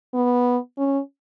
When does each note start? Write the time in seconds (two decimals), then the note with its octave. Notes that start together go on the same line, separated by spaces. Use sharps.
0.14 B3
0.78 C#4